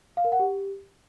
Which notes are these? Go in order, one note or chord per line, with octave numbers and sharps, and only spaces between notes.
F5
A#4
F#5
G4